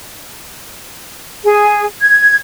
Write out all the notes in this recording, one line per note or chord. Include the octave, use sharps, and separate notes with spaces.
G#4
G#6